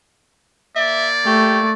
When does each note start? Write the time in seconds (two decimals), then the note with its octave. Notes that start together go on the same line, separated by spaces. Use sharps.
0.75 A#3 D5 E5
1.26 A3 G4 C#6